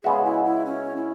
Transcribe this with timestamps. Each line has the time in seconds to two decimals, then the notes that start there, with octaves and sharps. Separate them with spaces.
0.03 C#3 G#3 B3 F#4 G#4 E5
0.25 E4
0.45 E4
0.65 C#4
0.96 E4